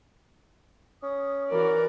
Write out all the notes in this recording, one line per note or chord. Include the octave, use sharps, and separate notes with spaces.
C#4 D#6
E3 F#4 A#4 D5